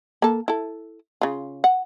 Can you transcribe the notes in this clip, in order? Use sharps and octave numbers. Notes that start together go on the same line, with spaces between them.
A#3 A4
E4 A4
C#3 F4
F#5